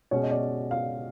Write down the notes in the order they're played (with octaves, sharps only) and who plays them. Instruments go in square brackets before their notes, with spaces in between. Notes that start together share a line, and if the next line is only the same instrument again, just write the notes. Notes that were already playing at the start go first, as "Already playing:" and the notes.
[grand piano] B2 G#3 C#4 [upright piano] C#5
[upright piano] D#5
D5
F5